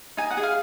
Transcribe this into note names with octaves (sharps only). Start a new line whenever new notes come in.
D#4 G#5
F#5
G#4
F5